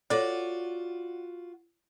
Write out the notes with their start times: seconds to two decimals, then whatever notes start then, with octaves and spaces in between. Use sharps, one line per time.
0.10 F4 F#4 A4 C#5 D5